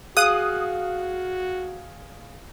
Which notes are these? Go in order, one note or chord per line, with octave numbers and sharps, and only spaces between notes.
F#4 G#4 F5 D#6 F#6